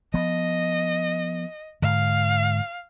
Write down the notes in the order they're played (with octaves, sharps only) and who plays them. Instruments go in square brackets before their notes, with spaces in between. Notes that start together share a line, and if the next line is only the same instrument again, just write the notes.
[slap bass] F3 B3 [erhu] D#5
[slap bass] G#2 D3 [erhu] F5